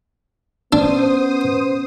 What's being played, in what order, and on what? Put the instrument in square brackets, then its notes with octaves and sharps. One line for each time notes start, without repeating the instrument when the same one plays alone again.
[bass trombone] B3 [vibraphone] C#4 [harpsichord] D4 [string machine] C5 D#6